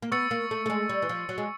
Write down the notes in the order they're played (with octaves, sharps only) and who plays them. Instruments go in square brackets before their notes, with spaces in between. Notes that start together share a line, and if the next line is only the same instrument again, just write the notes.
[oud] A#3
[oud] B3 [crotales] C#6 E6 A6 C#7
[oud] A#3
A3
A3
G#3
G3
E3
F3
F#3
G#3